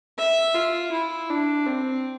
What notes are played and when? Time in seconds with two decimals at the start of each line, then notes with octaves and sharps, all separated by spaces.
0.18 E5
0.55 F4
0.92 E4
1.30 D4
1.66 C4